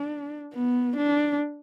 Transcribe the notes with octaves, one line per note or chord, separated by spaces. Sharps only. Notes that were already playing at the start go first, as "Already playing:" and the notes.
Already playing: D4
B3
D4